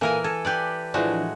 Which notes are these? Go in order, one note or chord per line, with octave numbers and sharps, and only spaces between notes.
A#2 E3 A#3 A4 A#4 G#5
A4 G#5
G4 B4 D5
A2 E3 F3 G#3 D4 F#4